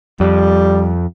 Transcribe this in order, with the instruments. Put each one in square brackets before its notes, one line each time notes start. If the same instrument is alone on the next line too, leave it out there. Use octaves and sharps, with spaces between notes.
[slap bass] F2 [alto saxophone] G3